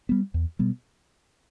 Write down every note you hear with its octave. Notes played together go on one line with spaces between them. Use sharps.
G3 B3
E2
B2 G3 B3